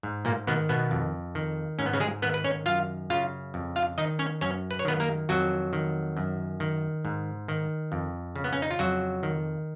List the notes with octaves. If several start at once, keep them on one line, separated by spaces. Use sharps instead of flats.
G#2
A#2 A#3
B2 D#3 B3
B2 B3
F2
D#3
G#2 C#4
B3
C#3 C#4
G#3 G#4
D#3 B3 B4
B4
C#4 C#5
F#2 F4 F5
C#3 F4 F5
F2
F4 F5
D#3 D#4 D#5
C#4 C#5
F#2 C#4 C#5
B4
C#5
D#3 B3 B4
A#3 A#4
F2 F#3 F#4
D#3
F#2
D#3
G#2
D#3
F2
C#3
B3
C#4
D#4
F4
F2 F#3 F#4
D#3